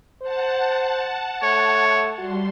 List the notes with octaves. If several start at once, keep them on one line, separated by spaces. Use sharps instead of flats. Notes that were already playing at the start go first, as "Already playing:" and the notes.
C5 F#5 A5
A3 C#5
G3 F#4 C6